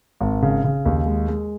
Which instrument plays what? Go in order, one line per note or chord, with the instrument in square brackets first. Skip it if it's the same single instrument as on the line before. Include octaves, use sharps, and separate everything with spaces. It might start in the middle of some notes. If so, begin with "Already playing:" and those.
[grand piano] G#1
C#3
C#3
D#2
G#3
G#3